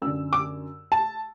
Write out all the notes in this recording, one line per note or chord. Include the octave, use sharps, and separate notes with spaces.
F#2 D3 E6
D6
A5